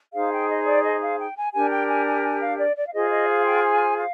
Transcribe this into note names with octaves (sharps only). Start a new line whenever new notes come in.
D#4 G#4 C5 F5
G5
D#5
D5
D#5
F5
G5
G#5
D4 G4 A#4 G#5
G5
G#5
G#5
G#5
F5
D5
D5
F5
F4 G#4 C5 D#5
D#5
F5
G5
G#5
F5